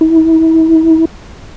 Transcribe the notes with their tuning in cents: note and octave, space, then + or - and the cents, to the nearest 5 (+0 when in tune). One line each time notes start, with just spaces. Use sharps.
E4 -35